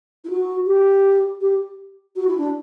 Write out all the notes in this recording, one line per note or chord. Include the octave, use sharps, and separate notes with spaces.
E4
F#4
G4
G4
F#4
E4
D4